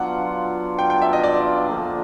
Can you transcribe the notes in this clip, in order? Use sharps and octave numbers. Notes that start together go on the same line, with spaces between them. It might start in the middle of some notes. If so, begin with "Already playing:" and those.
Already playing: F#3 B3 D4 F4 F#5
G5
G5
E5
D#5
D5
D3 F3 A#3 D4 F4